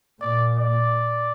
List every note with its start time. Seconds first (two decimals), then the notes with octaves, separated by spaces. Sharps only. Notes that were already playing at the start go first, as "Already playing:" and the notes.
0.21 A#2 D5
0.58 D5